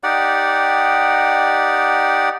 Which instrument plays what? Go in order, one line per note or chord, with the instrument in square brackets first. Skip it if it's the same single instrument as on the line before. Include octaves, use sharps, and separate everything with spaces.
[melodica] D#4 G4 D5 F#5